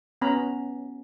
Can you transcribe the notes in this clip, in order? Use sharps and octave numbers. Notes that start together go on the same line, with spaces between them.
B3 C#4 A#5 B5